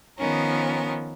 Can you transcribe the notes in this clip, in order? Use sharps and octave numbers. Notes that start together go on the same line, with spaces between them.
D#3 F3 B3 C#4 A#4